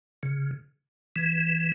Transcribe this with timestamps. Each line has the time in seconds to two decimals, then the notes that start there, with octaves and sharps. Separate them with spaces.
0.23 C#3
1.16 E3